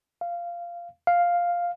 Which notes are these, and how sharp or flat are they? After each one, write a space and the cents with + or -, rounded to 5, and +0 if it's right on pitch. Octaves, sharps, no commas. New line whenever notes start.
F5 -15
F5 +0